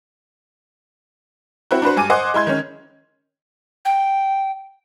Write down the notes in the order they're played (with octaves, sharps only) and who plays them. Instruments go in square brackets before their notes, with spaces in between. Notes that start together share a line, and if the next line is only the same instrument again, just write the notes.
[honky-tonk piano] C4 E4 F#4
D4 F#4 B4 C5
G2 G#5 D6 D#7
C5 D#5 F#5 G#5 C6 D6
G#3 E4 C6 G#6
D#3 G#3 C#4
[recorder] G5